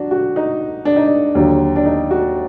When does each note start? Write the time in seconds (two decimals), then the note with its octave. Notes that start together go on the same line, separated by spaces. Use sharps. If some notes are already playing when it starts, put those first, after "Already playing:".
Already playing: F#3 D4 F#4
0.11 F#4
0.36 D#4
0.85 D4
0.96 D#4
1.06 D4
1.35 D#2 D3 F#3
1.76 D4
1.85 D#4
2.11 F#4